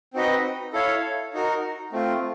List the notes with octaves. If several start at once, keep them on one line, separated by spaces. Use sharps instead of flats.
C4 D#4 F#4 B4 D#5
E4 A4 C#5 F5
D#4 F#4 A#4
A3 C4 F4